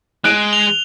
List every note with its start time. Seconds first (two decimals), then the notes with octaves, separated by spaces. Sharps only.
0.24 G#3 F#6 D7
0.53 F7 G7